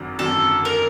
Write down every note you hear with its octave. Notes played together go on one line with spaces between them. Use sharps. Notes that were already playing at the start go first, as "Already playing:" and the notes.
Already playing: G#1 F#2 D3
G#1 F#2 D3 A4
A#4